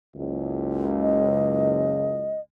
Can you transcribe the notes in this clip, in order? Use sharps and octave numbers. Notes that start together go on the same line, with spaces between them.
F#1 C#2
D#5